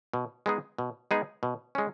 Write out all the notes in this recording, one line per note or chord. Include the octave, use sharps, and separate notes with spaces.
B2
G#3 B3 D#4 G#4
B2
G#3 B3 D#4 G#4
B2
G#3 C#4